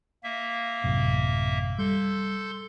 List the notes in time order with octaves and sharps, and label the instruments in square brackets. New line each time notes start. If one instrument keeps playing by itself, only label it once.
[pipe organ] A#3 E5
[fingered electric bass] A1 F#2 C3
[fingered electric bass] G3 [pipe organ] A4 C6 G6